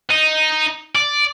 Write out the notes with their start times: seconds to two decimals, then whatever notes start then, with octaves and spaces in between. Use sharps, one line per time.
0.10 D#4
0.95 D5